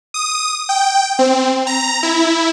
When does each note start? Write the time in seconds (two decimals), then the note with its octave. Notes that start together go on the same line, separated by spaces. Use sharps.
0.14 D#6
0.69 G5
1.19 C4
1.67 A#5
2.03 E4